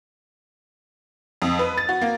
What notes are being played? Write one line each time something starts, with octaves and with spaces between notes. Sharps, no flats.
F2
B4
A6
F#4
A#3